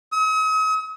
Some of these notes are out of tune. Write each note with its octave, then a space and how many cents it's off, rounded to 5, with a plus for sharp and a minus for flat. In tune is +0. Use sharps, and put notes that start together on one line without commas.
D#6 +45